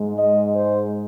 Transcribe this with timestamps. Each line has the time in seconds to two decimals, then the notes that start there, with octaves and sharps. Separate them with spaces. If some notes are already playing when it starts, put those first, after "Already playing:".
Already playing: G#2 G#3
0.18 D#5
0.55 C5